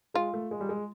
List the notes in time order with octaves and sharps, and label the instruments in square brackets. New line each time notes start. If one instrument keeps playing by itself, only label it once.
[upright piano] G#3 [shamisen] F4
[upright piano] A3
G#3
G3
G#3